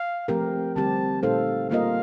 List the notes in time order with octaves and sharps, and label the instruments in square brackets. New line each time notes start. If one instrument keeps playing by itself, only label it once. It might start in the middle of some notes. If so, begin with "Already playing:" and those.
Already playing: [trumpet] F5
[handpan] F3 A3 C4 G4 A#4 [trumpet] G5
[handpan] D3 G3 C4 G4 [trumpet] A5
[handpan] A#2 A3 D#4 A4 C5 [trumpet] F5
[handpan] G3 A#3 F4 A#4 D#5 [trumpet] F5